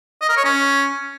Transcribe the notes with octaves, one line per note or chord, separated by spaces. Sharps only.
D#5
A#4
C#5
C#4